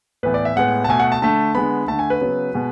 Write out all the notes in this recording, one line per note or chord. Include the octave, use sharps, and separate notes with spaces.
A2 E3 B3 B4
D5
E5
A2 G#3 B3 F#5
A5
B2 A3 G#5
F#5
A5
D3 A3 A5
D3 G#3 B3 B5
D3 A3 A5
G#5
B4
C#3 F#3 B3
B2 G#3 B3